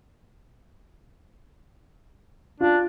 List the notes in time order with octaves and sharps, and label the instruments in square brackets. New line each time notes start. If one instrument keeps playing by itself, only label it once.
[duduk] D4 [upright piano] F4